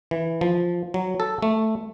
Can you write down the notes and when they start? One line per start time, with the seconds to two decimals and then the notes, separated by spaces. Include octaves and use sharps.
0.11 E3
0.41 F3
0.94 F#3
1.20 A4
1.42 A3